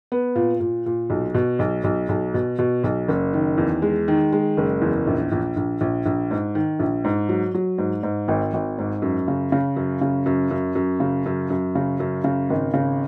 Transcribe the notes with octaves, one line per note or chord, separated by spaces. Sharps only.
B3
A#2
A#2
A#2
B1
B2
B1
B1
B1
B2
B2
B1
F#1
D#3
E2
G#3
D#3
G#3
F#1
E2
A#1
A#1
A#1
A#1
A#1
G#2
D#3
A#1
G#2
F#3
F#3
G#2
G#2
G#1
G#1
G#2
F#2
C#3
C#3
F#2
C#3
F#2
F#2
F#2
C#3
F#2
F#2
C#3
F#2
C#3
G#1
C#3